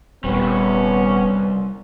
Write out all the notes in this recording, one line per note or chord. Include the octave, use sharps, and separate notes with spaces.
D#1 C3 G3 B3 C#4